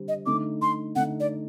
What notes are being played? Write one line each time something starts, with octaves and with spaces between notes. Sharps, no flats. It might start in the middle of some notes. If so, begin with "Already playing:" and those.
Already playing: D3 G3 C4 G4
D#5
D3 A3 D#4 D6
C6
D3 A3 D#4 F#5
D5